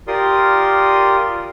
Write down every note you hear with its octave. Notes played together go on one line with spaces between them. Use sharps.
F4 G4 A#4 D5 C6 D#6